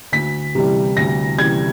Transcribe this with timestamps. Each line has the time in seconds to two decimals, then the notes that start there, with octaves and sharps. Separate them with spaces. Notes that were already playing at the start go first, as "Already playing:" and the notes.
0.12 D2 B6
0.55 C3 E3 G3
0.97 D2 A#6
1.39 C3 E3 G3 G#6